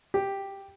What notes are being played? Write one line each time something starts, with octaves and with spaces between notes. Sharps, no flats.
G4